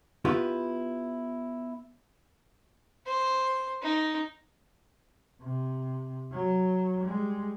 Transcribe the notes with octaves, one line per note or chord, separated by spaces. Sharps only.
B3 E4 F4 G4 B4
C5
D#4
C3
F#3
G3 G#3